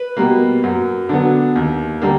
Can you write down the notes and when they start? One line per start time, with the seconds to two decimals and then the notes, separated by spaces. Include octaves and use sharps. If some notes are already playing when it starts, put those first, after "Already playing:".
Already playing: B4
0.17 B2 G3 A#3
0.64 F#2
1.09 D3 F#3 B3
1.55 D#2
2.02 D3 G3 A#3